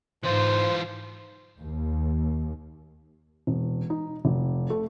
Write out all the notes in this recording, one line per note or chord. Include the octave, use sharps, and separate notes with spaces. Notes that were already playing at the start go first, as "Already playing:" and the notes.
G#2 E3 F4 C5
D#2
E1
D#4
F1
A3